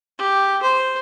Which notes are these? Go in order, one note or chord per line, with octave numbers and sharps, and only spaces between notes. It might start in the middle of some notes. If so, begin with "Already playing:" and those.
G4
C5